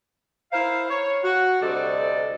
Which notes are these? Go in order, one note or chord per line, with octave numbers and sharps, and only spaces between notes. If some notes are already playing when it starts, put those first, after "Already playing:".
E4 A#4 C5 F5
C#5
F#4
D2 C3 G3 A4 D5 D#5